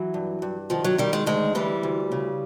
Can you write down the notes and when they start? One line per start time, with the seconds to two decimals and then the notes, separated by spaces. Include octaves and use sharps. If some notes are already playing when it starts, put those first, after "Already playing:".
Already playing: E3 F#3
0.14 G2
0.42 G2
0.70 D#3 F3
0.84 F#3
0.98 D#3 G3
1.13 G#3
1.26 D2 G#3
1.55 E3 G3
1.83 D2
2.12 C#3